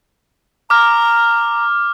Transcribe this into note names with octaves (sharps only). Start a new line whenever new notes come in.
A#5 D6 F6